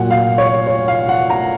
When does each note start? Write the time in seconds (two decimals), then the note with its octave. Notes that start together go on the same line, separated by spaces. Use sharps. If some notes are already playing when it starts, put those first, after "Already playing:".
Already playing: A#2 F#3 F#5
0.11 F5
0.38 C#5
0.67 C#5
0.88 F5
1.09 F#5
1.30 A#5